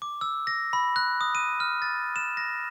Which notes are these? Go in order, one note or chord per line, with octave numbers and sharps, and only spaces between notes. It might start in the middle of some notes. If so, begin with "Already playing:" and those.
D6
E6
A#6
B5
F#6
D#6
D#7
F6
A6
E7
A#6